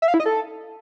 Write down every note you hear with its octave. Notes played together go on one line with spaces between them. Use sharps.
E5
F5
E4
D#5
A4